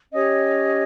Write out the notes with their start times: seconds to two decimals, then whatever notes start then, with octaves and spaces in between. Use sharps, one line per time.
0.12 C#4 G4 C#5 D#5